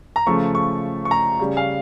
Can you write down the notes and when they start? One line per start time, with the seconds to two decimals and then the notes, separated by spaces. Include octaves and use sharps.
0.16 A#5
0.27 C#3 F3 A3 C#6
0.55 C#6
1.05 C#6
1.11 A#5
1.39 C#3 G3
1.57 F5